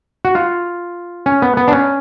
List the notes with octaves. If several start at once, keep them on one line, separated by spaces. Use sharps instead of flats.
F#4
F4
C#4
B3
B3
D4
C#4